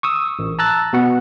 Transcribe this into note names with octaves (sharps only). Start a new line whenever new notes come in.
C#6 D#6 E6
A1
A5 A#5 E6 F#6 A6
B2 B3 F#4 F#5